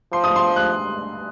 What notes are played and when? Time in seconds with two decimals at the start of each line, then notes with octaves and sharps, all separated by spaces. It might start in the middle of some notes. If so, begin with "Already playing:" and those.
0.12 F3 C6
0.24 D#6
0.36 C6
0.56 F#6